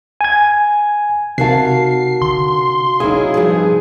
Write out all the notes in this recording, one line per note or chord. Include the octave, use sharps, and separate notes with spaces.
G#5 G#6
C3 D#4 F#4 A#4 F5 A5 C7
D3 C6
F#3 D#4 E4 G#4 F5
G2 C3 F3